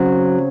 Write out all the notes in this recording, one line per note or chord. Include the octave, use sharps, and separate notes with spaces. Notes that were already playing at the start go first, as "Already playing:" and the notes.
Already playing: C#3 F#3 C4